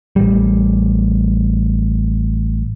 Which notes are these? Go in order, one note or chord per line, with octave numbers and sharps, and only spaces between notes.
A1 G3